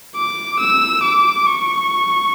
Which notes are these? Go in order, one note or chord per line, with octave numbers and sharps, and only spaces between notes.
D6
E6
D6
C#6